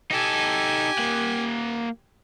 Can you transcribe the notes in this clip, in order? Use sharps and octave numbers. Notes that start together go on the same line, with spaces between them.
D#4 G4 A4 G#5
A#3 F#5